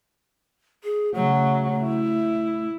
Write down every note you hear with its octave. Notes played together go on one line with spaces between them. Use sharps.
G#4
C#3 F#3 A3
E4